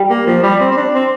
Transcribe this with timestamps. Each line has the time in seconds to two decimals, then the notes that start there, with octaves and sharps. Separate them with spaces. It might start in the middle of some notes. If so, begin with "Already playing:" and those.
Already playing: G3
0.09 A#3
0.26 F3
0.43 G3
0.60 C4
0.72 C4
0.77 D4
0.94 C4